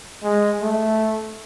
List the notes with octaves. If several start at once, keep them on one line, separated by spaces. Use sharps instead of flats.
G#3
A3